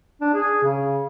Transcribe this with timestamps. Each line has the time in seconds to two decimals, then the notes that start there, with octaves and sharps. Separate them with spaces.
0.21 D4
0.34 G#4
0.63 C#3